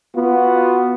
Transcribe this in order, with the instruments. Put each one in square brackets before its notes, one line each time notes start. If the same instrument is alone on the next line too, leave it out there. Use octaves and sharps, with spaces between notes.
[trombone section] B3 F4 F#4